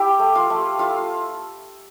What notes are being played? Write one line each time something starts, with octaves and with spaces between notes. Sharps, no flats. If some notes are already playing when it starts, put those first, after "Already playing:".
Already playing: E4 G4 G5
A3
F4 F5
A3
E4 F4 F5